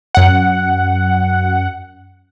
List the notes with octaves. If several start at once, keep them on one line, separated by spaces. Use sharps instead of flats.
F#2 F#5